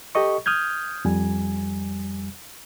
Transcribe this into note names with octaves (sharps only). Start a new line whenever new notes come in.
G4 A4 D#5 C#6
D#6 F6 G6 G#6
F2 G3 G#5